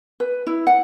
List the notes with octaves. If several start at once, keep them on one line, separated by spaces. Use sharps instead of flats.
B4
E4
F#5